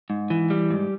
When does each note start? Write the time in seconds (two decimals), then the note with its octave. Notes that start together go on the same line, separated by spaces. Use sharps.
0.10 G#2
0.30 E3
0.50 G3
0.70 G#2